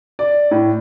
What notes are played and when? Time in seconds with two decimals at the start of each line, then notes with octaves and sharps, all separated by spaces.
0.19 D5
0.51 A2